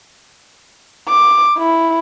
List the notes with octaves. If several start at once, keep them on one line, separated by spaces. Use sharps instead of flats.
D6
E4